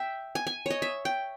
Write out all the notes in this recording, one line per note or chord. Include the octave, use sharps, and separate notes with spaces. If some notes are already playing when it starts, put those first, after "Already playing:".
Already playing: E5 G5
G#5
G#5
C#5 D#5
E5
G5